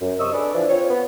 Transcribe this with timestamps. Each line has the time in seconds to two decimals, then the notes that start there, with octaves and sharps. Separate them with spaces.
0.01 F#2
0.20 C3 D#5 C#6 D#6 E6
0.33 D4 G#4 A4 B4 D5
0.54 E3 F3 D4
0.69 C4 F4 C#5
0.90 B3